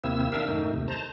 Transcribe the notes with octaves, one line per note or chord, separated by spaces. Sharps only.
D#2 C3 A#3 C4 E4 E6
D#3 D4 A#4 E5 F5 E6
F#2 A2 D#3 A3 D#4
D#2 C3
C5 A5 A#5